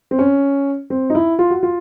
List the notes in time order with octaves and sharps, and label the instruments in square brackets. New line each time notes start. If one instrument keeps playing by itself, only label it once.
[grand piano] C4
C#4
C4
D#4
E4
F4
F#4
F4